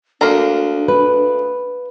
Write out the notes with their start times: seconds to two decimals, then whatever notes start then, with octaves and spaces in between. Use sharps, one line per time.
0.21 D2 A#3 D4 A#5
0.88 B4